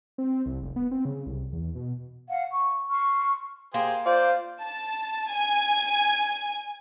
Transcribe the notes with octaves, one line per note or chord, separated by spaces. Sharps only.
C4
C2
F1
B3
C4
C#3
C2
E2
B2
F5 F#5
C#6
C6 C#6 F6
A#3 G4 G#4 C5
F4 C5 D5
A5
G#5